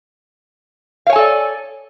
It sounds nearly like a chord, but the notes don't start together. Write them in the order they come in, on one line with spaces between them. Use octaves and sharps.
F5 C#5 G#5 A4 D5